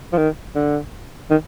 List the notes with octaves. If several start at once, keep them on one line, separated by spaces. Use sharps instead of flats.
F3
D#3
D3
D#3